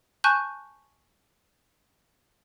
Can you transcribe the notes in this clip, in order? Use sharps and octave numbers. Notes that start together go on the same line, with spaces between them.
G#5 A5 C#6 F#6 G6